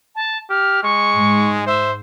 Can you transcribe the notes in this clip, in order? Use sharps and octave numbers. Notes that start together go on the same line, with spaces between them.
A5
G4 F6
G#3 C#6
G#2
C5 E5